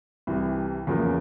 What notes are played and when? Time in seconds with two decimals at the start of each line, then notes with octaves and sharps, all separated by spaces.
0.27 C2 C3 E3
0.87 E2 C#3 F3 A#3